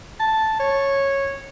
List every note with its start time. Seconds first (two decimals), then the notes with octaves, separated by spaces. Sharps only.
0.20 A5
0.60 C#5